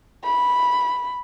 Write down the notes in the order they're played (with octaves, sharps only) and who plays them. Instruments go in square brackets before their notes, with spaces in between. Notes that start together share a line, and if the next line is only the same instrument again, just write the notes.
[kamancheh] B5